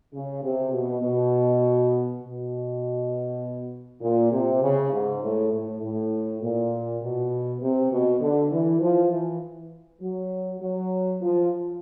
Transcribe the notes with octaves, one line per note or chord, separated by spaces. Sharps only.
C#3
C3
B2
B2
B2
A#2
C3
C#3
G#2
A2
A2
A2
A#2
B2
C3
B2
D3
E3
F3
E3
F#3
F#3
F3